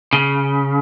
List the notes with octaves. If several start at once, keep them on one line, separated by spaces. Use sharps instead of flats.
C#3